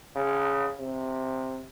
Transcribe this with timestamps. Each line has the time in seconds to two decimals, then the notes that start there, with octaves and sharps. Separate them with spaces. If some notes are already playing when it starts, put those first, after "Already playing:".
0.15 C#3
0.79 C3